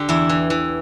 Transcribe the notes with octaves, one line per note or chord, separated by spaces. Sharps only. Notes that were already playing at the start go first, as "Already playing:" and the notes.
Already playing: D3 G4
E2 E4
E3
E3